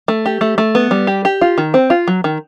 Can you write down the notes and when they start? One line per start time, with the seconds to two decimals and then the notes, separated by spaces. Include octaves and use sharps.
0.08 A3
0.26 G4
0.41 A3
0.58 A3
0.75 B3
0.91 G3
1.07 G4
1.25 G4
1.41 F4
1.58 D#3
1.74 C4
1.90 F4
2.08 F#3
2.24 D#3